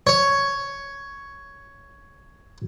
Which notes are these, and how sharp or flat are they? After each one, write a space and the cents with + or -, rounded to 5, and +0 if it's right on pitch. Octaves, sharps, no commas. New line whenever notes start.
C#5 +5